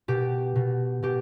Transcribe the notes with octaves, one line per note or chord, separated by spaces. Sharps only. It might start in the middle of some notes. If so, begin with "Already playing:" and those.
B2 G4
B2
B2 G4